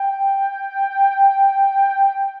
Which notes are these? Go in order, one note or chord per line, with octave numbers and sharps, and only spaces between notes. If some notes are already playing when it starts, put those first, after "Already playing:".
Already playing: G5